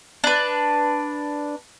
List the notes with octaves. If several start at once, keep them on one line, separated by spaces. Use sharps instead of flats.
D4 B4